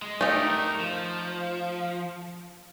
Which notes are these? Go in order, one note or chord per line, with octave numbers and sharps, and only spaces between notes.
G#3
A3 D#4 G4 A#4
F3